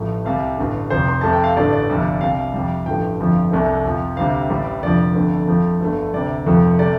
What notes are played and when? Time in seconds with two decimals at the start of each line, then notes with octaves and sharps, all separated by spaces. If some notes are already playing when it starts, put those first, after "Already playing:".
Already playing: A1 A2 F3 A3
0.25 C2 C3 G3 F5
0.58 A1 G2 D3
0.90 F1 F2 F3 C5
1.08 C6
1.21 F2 C3 A3 A5
1.33 G5
1.44 F5
1.57 A1 G2 D3 A3 D5
1.73 D5
1.89 G1 F2 C3 G3
2.21 C2 C3 G3 F5
2.54 F2 C3 G3
2.86 A1 G2 F3 A3 G5
3.20 G1 F2 F3 A3
3.52 C2 C3 A3
3.85 F2 C3 F3
4.17 D2 C3 G3 F5
4.49 A1 A2 G3
4.82 F1 F2 D3 F3 D5
5.15 G1 F2 D3 A3
5.47 F2 F3 A3
5.80 G1 G2 D3 A3
6.13 D2 C3 G3 D5
6.46 F1 F2 F3 A3
6.79 C3 A3 D5